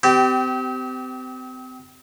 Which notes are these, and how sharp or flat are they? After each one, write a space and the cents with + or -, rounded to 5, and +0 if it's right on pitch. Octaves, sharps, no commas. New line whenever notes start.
C4 -35 G4 -20